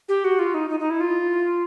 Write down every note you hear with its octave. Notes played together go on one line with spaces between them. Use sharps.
G4
F#4
F4
D#4
D#4
D#4
E4
F4